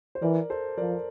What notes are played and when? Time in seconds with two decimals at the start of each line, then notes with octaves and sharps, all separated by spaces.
0.15 C5
0.22 E3 A#4 D5
0.50 A4 C5
0.78 F3 A#4 D5